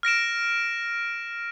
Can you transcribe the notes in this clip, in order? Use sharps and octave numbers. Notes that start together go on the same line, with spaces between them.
F6 A#6 D7 E7